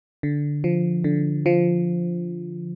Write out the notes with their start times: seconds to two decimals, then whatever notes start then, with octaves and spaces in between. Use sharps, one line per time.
0.23 D3
0.64 F3
1.04 D3
1.46 F3